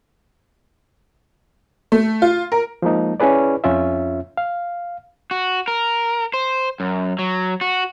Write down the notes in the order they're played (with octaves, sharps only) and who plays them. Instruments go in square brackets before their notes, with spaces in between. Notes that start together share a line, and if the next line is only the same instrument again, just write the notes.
[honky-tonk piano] A3
F4
A#4
[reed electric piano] F3 G#3 A#3 D#4
C#4 E4 G#4 B4 D5
F2 C#4 F4 E5
F5
[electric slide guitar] F#4
A#4
C5
F#2
F#3
F#4